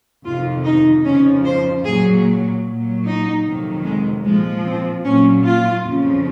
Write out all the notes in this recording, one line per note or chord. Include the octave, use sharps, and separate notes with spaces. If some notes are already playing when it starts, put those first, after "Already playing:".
F2 C3 D#3 F4
D#4
F2 C#3 F3 C#4
C5
A#2 F#3 G#4
A#2 F#3
D#4
F2 C3 D#3 F#3
G#3
A#2 F3 G#3
C4
A#2 F#3 C#4
F4
F2 C#3 F3